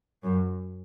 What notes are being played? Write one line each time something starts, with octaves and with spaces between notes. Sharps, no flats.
F#2